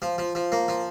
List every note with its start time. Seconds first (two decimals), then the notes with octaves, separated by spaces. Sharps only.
0.02 F3
0.18 F3
0.35 F3
0.52 A#3
0.68 F3